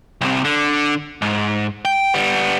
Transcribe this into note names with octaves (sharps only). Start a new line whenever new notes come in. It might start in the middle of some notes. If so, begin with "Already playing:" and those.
C2 C3
D3
G#2
G5
G3 B3